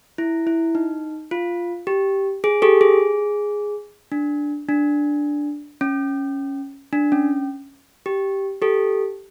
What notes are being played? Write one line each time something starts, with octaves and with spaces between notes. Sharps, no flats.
E4
E4
D#4
F4
G4
G#4
G4 A4
G#4
D4
D4
C#4
D4
C#4
G4
G4 A4